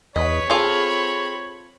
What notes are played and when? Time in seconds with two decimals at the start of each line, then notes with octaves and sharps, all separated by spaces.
0.16 E2 B4 C#5 D#5 B6
0.50 C4 F4 G#4 A4 B5